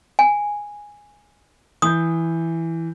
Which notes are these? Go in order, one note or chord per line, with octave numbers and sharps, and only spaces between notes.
G#5
E3 D#6 G6